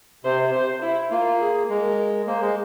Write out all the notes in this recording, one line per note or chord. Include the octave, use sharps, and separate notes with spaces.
C3 C5
C5
E4
A#3 F4
G#4
G#3 A#4
A#3 C5
G#3